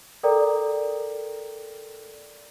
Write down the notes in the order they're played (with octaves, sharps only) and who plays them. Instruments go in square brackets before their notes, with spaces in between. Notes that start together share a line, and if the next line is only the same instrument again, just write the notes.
[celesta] A4 A#4 D5 G5 A#5